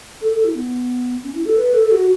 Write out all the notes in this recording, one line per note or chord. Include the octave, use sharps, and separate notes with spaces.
A4
A4
E4
B3
C#4
E4
A4
B4
A4
A4
F#4